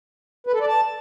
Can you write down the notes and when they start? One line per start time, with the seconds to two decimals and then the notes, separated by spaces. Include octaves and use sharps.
0.47 B4
0.54 A4
0.61 D5
0.67 A5